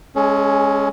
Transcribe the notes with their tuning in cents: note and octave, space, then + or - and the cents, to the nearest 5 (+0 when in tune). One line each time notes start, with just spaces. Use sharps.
G#3 +0 C#4 +0 A4 -45